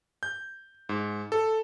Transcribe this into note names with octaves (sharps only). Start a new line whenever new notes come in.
G6
G#2
A4